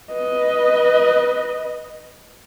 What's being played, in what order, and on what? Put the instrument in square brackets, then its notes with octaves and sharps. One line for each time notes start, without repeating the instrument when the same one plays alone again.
[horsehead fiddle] B4 D#5